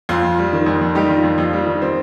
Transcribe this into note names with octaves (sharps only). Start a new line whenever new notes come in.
F2 F4
F2
G3
D#3
F2
F2
G3 D#4 G4
D#3 F4
F2
F2 F4
G3
D#3
C4